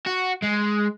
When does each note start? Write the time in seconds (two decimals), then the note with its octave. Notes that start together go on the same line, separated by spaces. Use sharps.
0.07 F#4
0.44 G#3